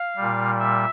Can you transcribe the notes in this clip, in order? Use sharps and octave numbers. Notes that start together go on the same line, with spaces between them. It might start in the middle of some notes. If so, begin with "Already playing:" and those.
Already playing: F5
A#2 G3
E5